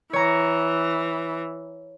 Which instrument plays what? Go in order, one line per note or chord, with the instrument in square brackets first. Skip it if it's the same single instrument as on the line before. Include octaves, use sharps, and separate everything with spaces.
[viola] E3 [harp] C#5 A#5